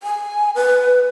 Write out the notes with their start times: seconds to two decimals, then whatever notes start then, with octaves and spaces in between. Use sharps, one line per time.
0.03 G#5
0.55 B4